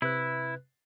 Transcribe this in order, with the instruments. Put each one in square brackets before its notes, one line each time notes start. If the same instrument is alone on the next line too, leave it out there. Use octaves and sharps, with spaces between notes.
[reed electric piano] C3 B4 F#6 [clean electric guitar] E4